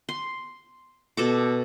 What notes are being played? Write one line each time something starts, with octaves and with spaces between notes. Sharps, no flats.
C6
B2 A4 D6